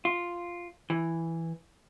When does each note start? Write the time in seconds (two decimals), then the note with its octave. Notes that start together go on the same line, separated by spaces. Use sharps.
0.05 F4
0.90 E3